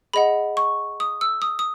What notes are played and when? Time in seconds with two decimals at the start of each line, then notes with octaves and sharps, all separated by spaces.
0.14 G#4 D#5 F#5 B5
0.57 C#6
1.00 D#6
1.21 E6
1.42 D#6
1.59 D#6